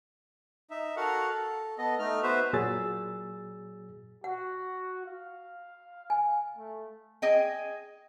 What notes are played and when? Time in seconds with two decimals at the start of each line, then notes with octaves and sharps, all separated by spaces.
0.70 D#4 E5
0.97 F#4 A4 A#4 F5 F#5
1.29 A4
1.78 B3 A4 D#5
1.99 A3 D#4 F6
2.23 B3 F#4 B4 C5 E5
2.53 A#2 F#3 G#4 E6 A6
4.24 F#4 F#5
5.06 F5
6.10 G#5
6.57 A3
7.22 G#4 D#5 G5